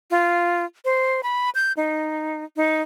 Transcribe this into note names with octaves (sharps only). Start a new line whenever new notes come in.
F4
C5
B5
G6
D#4
D#4